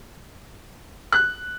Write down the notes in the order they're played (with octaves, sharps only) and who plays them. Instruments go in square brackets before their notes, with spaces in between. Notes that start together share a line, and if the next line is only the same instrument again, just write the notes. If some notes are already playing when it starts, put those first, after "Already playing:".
[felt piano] F#6